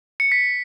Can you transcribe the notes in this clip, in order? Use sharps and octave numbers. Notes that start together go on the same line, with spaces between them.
C#7
B6